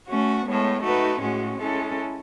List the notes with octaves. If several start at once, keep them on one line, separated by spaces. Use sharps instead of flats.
A3 C#4 F#4
A2 G#3 B3
A3 D#4 F#4 B4
A2 G#3 C#4 F#4
G#3 C#4 E4 A4